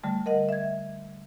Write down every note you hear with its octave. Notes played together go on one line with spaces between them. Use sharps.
D3 G3 A3
A#4 D#5 F#5
E5 G#6